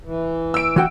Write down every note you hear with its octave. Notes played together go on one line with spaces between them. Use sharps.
E3
E6 D7
E3 F#4 G5